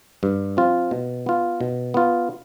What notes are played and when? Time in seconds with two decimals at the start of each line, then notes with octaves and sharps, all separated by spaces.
0.23 G2
0.57 F3 C4 F4
0.91 B2
1.26 B3 F4
1.61 B2
1.94 B3 F4